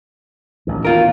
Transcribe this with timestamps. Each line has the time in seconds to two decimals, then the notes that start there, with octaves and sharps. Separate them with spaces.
0.67 A1 D#2
0.85 B2 F4 A#4